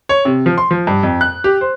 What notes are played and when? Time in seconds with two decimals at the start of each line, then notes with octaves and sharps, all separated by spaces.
0.09 C#5
0.25 C3
0.46 F3
0.58 C6
0.71 F3
0.87 G2
1.03 F2
1.21 F#6
1.44 G4
1.61 C5